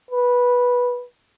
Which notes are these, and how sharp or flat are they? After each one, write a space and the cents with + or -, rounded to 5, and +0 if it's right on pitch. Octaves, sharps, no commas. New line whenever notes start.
B4 -10